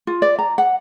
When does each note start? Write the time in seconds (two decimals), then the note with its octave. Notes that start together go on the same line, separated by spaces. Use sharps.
0.07 F4
0.22 D5
0.39 A#5
0.58 F#5